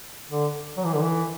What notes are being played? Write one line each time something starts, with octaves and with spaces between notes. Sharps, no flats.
D3
F#3
E3
D3
E3